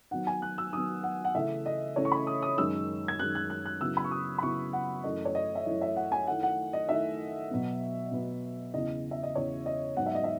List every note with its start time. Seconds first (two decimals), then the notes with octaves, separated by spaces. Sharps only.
0.11 D#3 F#3 B3 F#5
0.27 G#5
0.42 F#6
0.58 E6
0.73 D#3 F#3 B3 D#6
1.03 F#5
1.25 F#5
1.35 C#3 E3 A3 C#4 E5
1.66 D#5
1.96 C#3 E3 A3 C#4 C#5
2.05 C#6
2.12 B5
2.27 D#6
2.43 D#6
2.58 F#2 D#3 G#3 E6
3.08 G#6
3.19 F#2 D#3 G#3 F#6
3.35 F#6
3.50 F#6
3.65 F#6
3.81 C#3 F#3 B3 E4 E6
3.97 B5
4.04 C#6
4.11 D#6
4.38 B5
4.42 C#3 F#3 B3 E4 C#6
4.73 F#5
5.04 F#2 E3 A3 E4 D#5
5.25 C#5
5.35 D#5
5.55 E5
5.66 F#2 E3 A3 E4 D#5
5.81 E5
5.96 F#5
6.12 G#5
6.27 D#3 A3 E4 F#5
6.43 F#5
6.73 D#5
6.89 D#3 A3 E4 E5
7.51 B2 F#3 B3
8.12 B2 F#3 B3
8.74 E2 C#3 E3 D#5
9.11 E5
9.23 D#5
9.35 E2 C#3 E3 C#5
9.66 D#5
9.97 G#2 F#3 B3 F#5
10.06 E5
10.15 D#5
10.24 E5